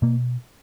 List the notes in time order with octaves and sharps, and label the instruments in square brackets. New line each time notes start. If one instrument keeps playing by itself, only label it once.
[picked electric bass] B2 A#3